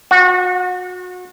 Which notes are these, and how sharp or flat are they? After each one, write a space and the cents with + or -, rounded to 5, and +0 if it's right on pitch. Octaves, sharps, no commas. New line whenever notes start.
F#4 -30